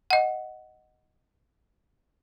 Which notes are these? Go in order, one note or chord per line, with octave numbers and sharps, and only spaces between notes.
D#5 F#5